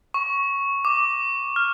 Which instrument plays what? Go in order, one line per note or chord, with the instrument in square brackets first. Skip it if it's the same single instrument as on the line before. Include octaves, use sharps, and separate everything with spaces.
[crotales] C#6
D6
F6